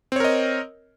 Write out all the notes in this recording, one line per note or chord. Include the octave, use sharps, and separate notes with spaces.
C4 A#4 C#5 D#5